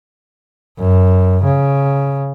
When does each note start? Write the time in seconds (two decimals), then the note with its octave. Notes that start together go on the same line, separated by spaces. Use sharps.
0.79 F#2
1.44 C#3